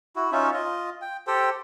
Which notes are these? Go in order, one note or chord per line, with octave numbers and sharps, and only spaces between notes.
E4 F#4
C#4 D#4 F4 E5
F4 D#5
G5
G4 A4 C5 G5